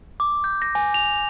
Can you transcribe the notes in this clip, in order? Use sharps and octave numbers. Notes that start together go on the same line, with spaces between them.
D6
G6
A#6
G#5
F7